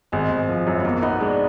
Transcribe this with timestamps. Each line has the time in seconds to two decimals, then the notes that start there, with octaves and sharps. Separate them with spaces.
0.12 G#1 G#3
0.31 G#1
0.49 F3
0.67 F#2
0.80 B1 A#3 B3
1.02 B3 D#4
1.21 G#3 D4